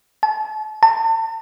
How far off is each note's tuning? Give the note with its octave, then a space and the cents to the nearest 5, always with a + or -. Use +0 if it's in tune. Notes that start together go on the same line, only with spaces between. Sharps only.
A5 -40
A5 +40